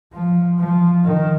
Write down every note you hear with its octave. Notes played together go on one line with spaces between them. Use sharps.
F3
F3
D#3